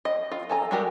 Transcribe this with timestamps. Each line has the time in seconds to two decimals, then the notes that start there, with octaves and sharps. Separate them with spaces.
0.05 D#5
0.32 F4
0.49 A4 G#5 A#5
0.71 G3 G#3 F#4 G4 A#4